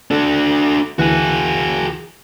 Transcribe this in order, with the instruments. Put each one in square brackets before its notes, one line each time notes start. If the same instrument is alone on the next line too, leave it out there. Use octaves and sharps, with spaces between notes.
[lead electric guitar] D4 F#4 [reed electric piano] A4
[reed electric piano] D2 E3 F#6 [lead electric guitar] F#4 G#4